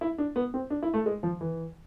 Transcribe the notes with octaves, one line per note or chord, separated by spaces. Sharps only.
E4
D4
B3
C4
D4
E4
A3
G#3
F3
E3